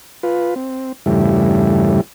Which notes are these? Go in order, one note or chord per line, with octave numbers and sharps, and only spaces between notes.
F4 B4
C4
E2 G2 C#3 G3 A3 E4